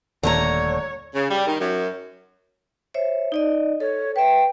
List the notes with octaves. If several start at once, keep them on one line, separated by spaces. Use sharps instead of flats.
D#1 D#2 D3 A3 C#5 A#5
C#3
G3
D#3
F#2
C5 C#5 E5
D#4 D5 D#5
A4 C#5
B4 E5 G5